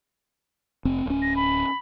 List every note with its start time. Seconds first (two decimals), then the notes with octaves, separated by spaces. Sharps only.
0.85 F1 C4
1.06 D1 C#4
1.22 A#6
1.36 B5